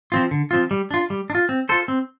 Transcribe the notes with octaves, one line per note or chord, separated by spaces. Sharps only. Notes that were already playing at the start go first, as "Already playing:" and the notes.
F3 C4 F4
D3
F3 C4 F4
G3
D4 F4
G3
D4
F4
C4
F4 A4 C5
C4